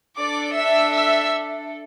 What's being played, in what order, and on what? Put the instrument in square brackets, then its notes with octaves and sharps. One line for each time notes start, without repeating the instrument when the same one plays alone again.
[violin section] D4 A4 D5 D6
E5 E6
E5 E6